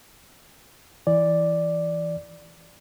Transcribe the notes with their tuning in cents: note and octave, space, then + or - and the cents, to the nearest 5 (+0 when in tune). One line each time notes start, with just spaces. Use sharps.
E3 +0 D5 +0